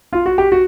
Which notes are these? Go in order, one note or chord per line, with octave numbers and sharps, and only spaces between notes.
F4
F#4
G4
F#4